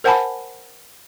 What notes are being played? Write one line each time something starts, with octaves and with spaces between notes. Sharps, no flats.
A#4 C5 F#5 G#5 A5 B5